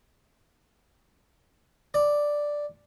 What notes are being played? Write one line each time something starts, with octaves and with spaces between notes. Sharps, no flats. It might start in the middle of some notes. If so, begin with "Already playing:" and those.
D5